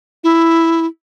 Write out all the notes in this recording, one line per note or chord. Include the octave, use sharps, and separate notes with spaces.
E4